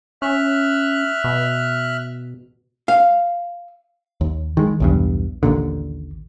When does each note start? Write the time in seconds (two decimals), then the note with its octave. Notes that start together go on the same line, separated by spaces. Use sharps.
0.22 C#4 E5 F6 F#6
1.24 B2
2.88 F5
4.21 D#2
4.57 D#3 G#3
4.80 B1 E2 G2
5.43 A1 D#2 A#2 D3